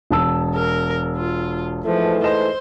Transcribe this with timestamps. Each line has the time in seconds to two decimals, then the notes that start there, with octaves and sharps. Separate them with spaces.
0.11 E1 A5 E6
0.55 A#4
1.16 F4
1.86 G#2 E3 F3 A3
2.24 C5 D#5 C6 E7